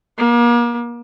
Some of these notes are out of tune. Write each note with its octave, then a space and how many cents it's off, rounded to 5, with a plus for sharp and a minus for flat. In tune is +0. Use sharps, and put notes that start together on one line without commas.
A#3 +35